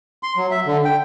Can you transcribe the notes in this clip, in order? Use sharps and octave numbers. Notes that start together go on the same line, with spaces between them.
C6
F#3
E5
D3
G5